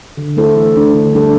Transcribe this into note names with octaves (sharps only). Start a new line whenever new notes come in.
D3
A3 E4 A4 C5
E3
A3 D4
D3
G3 D4 A4